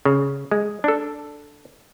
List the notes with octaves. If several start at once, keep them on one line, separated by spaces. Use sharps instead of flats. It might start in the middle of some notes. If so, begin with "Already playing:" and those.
C#3
G#3
D4 A4